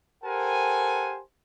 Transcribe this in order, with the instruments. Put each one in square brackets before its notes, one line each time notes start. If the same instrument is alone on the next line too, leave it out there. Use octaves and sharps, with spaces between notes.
[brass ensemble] G4 A4 A#4 C5 F#5 G#5